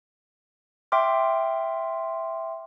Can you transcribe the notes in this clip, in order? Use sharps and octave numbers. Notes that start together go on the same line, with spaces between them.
E5 G5 C6 D6 F6